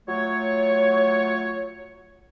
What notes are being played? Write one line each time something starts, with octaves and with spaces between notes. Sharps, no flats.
F#3 A3 F4 C#5